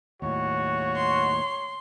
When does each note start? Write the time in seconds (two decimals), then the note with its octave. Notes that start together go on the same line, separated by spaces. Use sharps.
0.22 D#2 A2 F#4 C#5
0.96 C6